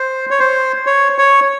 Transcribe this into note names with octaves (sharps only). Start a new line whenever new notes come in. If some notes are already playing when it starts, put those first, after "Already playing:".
Already playing: C5
C#5
C5
C#5
C#5